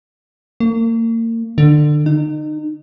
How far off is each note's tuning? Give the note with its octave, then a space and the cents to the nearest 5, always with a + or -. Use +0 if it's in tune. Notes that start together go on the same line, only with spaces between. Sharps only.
A#3 -35
D3 +25
D#4 -30